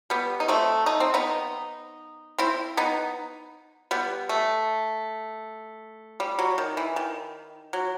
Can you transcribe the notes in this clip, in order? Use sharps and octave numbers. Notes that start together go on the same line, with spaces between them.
G3 B3
D#4
A3 C4
D#4
C4
B3 D#4
C4 E4
B3 D#4
G3 B3
A3
G3
F#3
D#3
E3
D#3
F#3